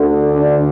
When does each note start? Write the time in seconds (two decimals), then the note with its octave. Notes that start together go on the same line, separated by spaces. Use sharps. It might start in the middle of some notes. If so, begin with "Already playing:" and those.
Already playing: D2 D3
0.35 D4